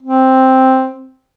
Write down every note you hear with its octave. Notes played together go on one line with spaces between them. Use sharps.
C4